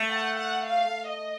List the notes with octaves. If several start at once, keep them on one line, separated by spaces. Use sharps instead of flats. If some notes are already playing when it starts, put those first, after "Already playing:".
Already playing: A3
F#5
F#5
F5
D#5